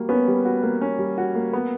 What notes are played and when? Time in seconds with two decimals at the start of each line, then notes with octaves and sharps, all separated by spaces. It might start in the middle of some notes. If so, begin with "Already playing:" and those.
Already playing: G3 A#3 F#4
0.09 B3 C#4
0.27 G3
0.45 F#4
0.63 A#3
0.81 C#4
0.99 G3
1.18 F#4
1.35 A#3
1.53 B3